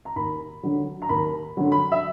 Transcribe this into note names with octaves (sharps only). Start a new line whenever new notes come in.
A#5
D#2 B5
D3 F#3
A#5
D#2 B5
D3 F#3
B5
E5